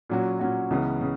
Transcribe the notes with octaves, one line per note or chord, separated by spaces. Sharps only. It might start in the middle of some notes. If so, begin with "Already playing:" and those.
A#2 F#3 C#4 F#4
A#2 F#3 C#4 F#4
C#2 C#3 E3 B3
C#3